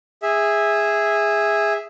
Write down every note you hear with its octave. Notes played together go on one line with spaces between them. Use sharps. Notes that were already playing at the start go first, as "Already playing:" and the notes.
G#4 E5